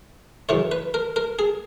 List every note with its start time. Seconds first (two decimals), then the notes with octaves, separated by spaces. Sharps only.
0.49 F#2 C#3 E3 C#5
0.72 B4
0.94 A#4
1.16 A#4
1.39 G#4